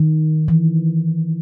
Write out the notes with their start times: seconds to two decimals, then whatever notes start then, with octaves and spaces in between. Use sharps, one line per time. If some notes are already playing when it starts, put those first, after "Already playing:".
Already playing: D#3
0.48 E3